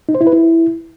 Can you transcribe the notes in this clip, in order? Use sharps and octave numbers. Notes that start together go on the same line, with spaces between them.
D#4
C5
E4
B4
E4